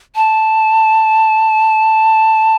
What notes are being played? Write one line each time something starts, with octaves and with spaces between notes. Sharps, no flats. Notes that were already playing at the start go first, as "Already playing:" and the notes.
A5